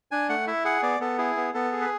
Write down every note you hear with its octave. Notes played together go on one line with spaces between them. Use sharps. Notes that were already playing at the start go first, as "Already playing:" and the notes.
D4 G#5
A3 F#5
E4 E5
G#4 F#5
B3 D5
B3 A4
E4 G#4
B3
B3 A4
G#4
B4